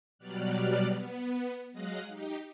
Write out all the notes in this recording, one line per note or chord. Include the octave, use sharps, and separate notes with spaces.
B2 F#3 G3 D5 F6 F#6
B3
F#3 G#3 D#5 F5 F#6 A#6
D#4 G4